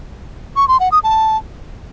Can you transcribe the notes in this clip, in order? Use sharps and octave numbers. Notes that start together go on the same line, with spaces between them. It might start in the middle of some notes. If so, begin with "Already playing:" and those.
C#6
C6
F#5
D#6
A5